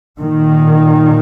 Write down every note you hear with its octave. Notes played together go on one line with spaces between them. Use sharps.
A#2 D#3